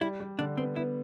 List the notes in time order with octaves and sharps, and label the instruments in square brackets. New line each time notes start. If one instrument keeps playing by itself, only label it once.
[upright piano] G3 [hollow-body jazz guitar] E4
[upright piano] G3
[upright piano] D3 [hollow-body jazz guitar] D4
[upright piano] B3 [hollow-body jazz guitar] C4
[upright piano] B3 [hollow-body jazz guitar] E4